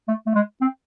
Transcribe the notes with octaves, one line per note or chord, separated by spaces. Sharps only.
A3
A3
G#3
C4